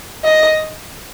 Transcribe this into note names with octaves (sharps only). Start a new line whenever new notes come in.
D#5